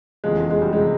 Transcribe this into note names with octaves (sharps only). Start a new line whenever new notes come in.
F1 E2 C#3 F3 G#3
G#3
G3
G#3
C3